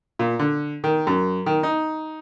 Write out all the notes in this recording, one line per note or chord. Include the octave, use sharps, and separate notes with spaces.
A#2
D3
D#3
F#2
D#3
D#4